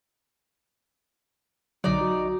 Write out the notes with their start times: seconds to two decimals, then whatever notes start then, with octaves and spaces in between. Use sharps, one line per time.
1.84 B1 D3 F#3 D#4 D5
2.01 F#4